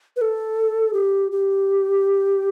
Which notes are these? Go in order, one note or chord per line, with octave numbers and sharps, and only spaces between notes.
B4
A4
G4
G4